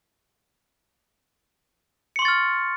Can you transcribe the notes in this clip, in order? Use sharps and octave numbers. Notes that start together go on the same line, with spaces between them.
C6 C#6 F6 A6 C#7